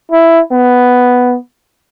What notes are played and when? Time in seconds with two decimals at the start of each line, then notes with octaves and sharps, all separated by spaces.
0.12 E4
0.52 B3